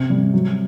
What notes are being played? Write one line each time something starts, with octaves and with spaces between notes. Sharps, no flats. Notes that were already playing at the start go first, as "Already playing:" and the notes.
Already playing: C3
G3
F#3